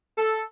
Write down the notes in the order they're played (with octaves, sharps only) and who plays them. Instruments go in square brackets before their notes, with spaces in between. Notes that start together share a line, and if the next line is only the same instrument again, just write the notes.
[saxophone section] A4